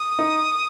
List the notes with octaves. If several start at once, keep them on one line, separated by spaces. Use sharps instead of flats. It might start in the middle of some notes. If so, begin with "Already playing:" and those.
Already playing: D#6
D#4